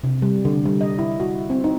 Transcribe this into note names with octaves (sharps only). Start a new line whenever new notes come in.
C3
G3
D3
G3
D#5
E4
F#4
C4
D#4